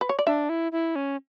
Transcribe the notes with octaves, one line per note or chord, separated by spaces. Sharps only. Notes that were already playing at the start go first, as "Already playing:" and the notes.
B4
C#5
D5
D4 E5
E4
E4
C#4